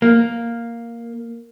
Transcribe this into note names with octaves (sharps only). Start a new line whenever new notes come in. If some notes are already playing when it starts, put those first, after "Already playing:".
A#3